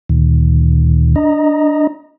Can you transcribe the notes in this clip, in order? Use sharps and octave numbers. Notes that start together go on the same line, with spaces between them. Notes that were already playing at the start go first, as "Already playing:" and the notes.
D2 A#2 D#3
D4 D#5 A#5